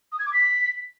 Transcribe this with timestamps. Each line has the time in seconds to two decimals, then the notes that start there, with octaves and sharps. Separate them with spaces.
0.12 D#6
0.19 G#6
0.26 D6
0.33 B6